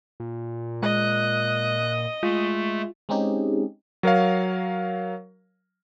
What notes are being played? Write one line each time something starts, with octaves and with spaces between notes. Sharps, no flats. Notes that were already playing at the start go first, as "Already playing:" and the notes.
A#2
G#3 D#5 F#6
G#3 A3 F4
G#3 C4 C#4 D#4 G4 G#4
F#3 A#4 C#5 F5